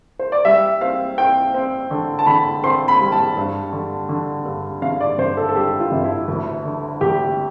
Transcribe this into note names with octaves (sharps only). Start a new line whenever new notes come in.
C5
D5
G3 E5
C4 F5
C4 G5
C4
D3
A5
D3 B5
C4 C6
B5
G3
A5
G2
D3
D3
G2
G1 F5
D5
G1 C5
A4
A4
G2 G4
F4
G1
E4
D2
D3
D2 G4